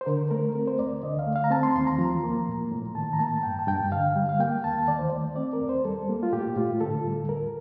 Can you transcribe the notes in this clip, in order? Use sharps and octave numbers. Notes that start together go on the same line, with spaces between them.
C5
D3 A#4
A3 A#4
C4 A#4
C5
D2 D5
D3 D#5
F5
A3
F5
A#5
C4 A5
C6
D#2 C6
A#5
F3
A#3
A2
A2
D#3 A5
A#5
A#3 A5
G2 G5
A5
G2 G5
D3 F5
G3
F5
A#3 G5
D#2 A5
D#3 D5
C5
A3 D5
C4 D5
A#4
D#2
C5
G3 A4
A#3
F4
A2 G4
A2 F4
D3 A4
G3
D#2 A#4